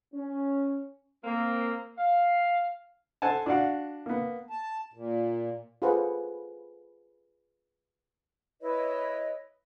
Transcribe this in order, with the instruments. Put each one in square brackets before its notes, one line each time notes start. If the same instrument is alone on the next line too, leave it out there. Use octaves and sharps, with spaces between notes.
[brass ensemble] C#4
[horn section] A#3 C4
F5
[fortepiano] A4 C5 F#5 G#5 A5
D4 F#4 D5 F5 F#5
A#3 B3
[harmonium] A5
A#2
[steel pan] F4 G#4 A4 B4 C5 F#5
[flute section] E4 B4 C#5 D#5